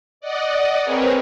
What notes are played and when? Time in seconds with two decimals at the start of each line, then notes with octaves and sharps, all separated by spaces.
0.21 D5 D#5 F#5
0.83 C4 G#4 A#4 B4 C#5